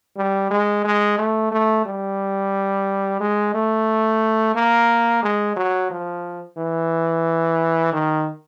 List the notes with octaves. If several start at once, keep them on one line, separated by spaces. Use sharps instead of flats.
G3
G#3
G#3
A3
A3
G3
G#3
A3
A#3
G#3
F#3
F3
E3
D#3